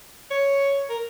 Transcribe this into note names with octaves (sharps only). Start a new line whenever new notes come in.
C#5
A#4